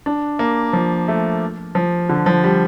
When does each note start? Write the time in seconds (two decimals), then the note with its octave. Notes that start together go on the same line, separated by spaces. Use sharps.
0.06 D4
0.39 A#3
0.73 F3
1.08 A3
1.75 F3
2.09 D3
2.26 F3
2.44 G3